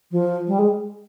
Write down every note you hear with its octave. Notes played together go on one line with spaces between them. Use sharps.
F3
G3
G#3